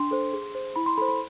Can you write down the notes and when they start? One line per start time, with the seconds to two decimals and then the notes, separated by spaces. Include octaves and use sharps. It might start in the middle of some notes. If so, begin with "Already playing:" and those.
Already playing: D4 C6
0.11 A4 C5
0.33 G#4
0.55 C5
0.76 E4 B5
0.86 C6
0.97 A4 B5
1.02 C5
1.08 B5